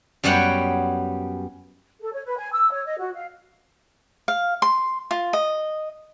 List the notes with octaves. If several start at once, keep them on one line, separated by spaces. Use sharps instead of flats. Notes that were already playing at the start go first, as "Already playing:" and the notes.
F#2 G3 B3 C#5 F#5 G5
A4
C#5
B4
G#5
E6
C#5
D#5
F#4
F5
F5
C6
F4
D#5